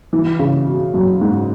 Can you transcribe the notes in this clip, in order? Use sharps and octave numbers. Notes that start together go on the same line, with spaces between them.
E3
C#3
B2
F#2
G#2